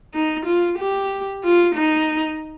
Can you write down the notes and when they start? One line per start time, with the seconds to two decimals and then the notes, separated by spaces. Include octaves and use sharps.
0.14 D#4
0.46 F4
0.79 G4
1.43 F4
1.76 D#4